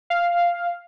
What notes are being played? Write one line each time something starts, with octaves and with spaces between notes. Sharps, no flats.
F5